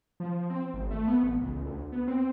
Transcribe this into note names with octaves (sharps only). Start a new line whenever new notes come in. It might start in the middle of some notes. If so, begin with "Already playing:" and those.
F3
C4
G#1
A3
B3
A1
C#2
D2
B3
C4